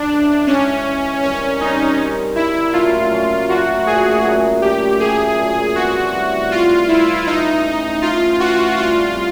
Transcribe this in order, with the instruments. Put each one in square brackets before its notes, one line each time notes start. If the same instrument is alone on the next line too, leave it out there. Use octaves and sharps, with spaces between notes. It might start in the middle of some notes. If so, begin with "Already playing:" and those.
Already playing: [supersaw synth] D4
[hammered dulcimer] C#3 E3 G#3
[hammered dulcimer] C#3 E3 G#3 [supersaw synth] C#4
[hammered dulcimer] C#3 E3 G#3
[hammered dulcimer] D#3 G3 C4 [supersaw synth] C#4
[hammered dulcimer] D#3 G3 C4 [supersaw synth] D#4
[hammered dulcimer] D#3 G3 C4
[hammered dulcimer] D#3 G3 C4 [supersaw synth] E4
[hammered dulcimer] A#2 F#3 A3 C#4 [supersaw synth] F4
[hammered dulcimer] A#2 F#3 A3 C#4
[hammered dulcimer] A#2 F#3 A3 C#4 [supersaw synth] F#4
[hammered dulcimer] A#2 F#3 A3 C#4 [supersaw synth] G#4
[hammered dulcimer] A#2 F#3 A3
[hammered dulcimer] A#2 F#3 A3 [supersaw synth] G4
[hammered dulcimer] A#2 F#3 A3 [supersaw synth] G#4
[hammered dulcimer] A#2 F#3 A3
[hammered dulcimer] A2 E3 G3 C4 [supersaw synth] F#4
[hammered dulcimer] A2 E3 G3 C4
[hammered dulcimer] A2 E3 G3 C4 [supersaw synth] F4
[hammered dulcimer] A2 E3 G3 C4 [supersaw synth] E4
[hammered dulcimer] E3 A3 C#4 [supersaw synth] D#4
[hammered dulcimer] E3 A3 C#4
[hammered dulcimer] E3 A3 C#4 [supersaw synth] F4
[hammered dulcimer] E3 A3 C#4 [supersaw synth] F#4
[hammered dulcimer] D3 G3 C4 [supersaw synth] F4
[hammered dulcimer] G3 C4